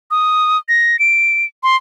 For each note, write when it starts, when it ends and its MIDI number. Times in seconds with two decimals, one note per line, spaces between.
0.11 0.58 87
0.69 0.99 94
0.99 1.45 98
1.63 1.76 84